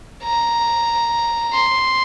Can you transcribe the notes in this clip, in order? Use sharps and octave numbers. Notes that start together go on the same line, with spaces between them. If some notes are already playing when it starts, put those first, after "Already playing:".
A#5
C6